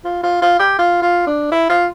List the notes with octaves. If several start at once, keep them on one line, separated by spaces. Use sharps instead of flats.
F4
F4
F4
G4
F4
F4
D4
E4
F4